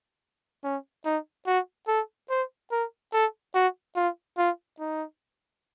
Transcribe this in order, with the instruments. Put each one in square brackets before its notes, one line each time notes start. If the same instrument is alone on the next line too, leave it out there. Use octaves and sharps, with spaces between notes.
[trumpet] C#4
D#4
F#4
A4
C5
A#4
A4
F#4
F4
F4
D#4